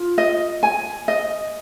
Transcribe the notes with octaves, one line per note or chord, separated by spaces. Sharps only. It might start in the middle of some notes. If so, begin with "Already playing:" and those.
Already playing: F4
D#5
G#5
D#5